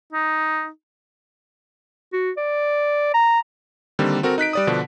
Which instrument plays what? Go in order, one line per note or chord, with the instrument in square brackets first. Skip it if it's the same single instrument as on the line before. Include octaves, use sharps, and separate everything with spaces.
[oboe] D#4
[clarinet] F#4
D5
A#5
[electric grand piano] D3 D#3 G3 A#3 C4
C4 F#4 A4 A#4
D#4 F#6 B6 D7
G3 D5 D#6
B2 D3 F3 D4